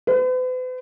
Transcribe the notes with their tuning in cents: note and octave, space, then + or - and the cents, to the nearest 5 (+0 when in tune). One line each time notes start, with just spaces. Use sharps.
B4 +45